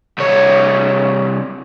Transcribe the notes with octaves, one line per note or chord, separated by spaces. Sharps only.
C2 C#5